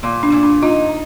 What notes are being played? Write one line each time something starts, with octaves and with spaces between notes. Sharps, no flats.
A#2
D4
A#2
D4
D#4 F4